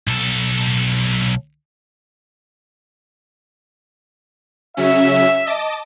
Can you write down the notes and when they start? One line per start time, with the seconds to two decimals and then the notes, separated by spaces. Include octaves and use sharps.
0.07 B1 A4
4.77 C#3 F#3 C#4 E5
5.46 D#5 A5 D6